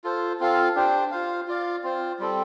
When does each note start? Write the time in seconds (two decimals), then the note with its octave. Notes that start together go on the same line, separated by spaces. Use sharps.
0.04 F4 A4 C5
0.40 C4 F4 A4 F5
0.75 D4 G4 C5
1.11 F4 C5 F5
1.48 F4 D5 F5
1.83 C4 F4 C5
2.19 G3 C4 A4